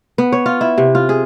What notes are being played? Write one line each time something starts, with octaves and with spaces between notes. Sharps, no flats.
B3
C#5
F4
E4
C3
F4
G#4